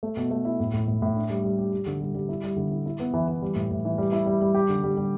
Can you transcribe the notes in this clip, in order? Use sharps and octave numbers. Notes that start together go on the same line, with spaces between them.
A3
B2
A3
E4
A2
A2
A2
A2
D4
G3
G3
G4
G4
D3
G3
G3
E4
G3
D3
E4
E4
B3
E3
E3
G3
A2
A2
E3
G3
E4
G3
G3
G4
D3
G3
G3